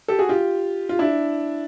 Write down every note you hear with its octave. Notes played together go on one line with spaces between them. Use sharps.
G4 A4
F#4 G#4
F4 G4
F4
D4 E4